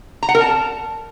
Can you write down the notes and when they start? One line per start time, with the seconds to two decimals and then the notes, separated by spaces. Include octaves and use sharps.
0.23 A#5
0.29 F#5
0.35 A#4
0.41 A5